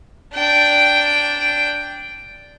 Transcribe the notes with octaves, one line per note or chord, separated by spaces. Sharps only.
D4 G5